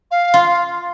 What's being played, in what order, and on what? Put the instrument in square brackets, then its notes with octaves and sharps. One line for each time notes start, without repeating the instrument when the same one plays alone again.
[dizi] F5
[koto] F4